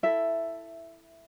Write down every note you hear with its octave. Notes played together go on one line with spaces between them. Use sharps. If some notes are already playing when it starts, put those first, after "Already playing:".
E4 A4 E5